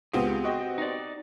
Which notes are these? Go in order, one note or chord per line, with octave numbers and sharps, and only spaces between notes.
C#2 B3 C4 G4 G#4
F#4 D#5 G5
D#4 D5